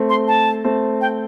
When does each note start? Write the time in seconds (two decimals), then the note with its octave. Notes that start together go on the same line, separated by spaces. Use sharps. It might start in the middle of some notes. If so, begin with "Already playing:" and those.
Already playing: A3 C4
0.09 C6
0.28 A5
0.64 A3 C4
1.01 G5